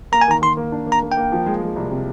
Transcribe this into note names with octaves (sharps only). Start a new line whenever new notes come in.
A#3 A#5
G#5
D#3 A#5
D#3 C6
A#3
D4
A#3
A#5
A#3
G5
A#3
F3
G#3
G#3
C2
C3